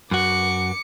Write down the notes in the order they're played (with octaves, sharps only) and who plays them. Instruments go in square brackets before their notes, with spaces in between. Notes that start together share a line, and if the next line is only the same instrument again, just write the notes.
[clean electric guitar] F#2 F#4 [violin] D6 C#7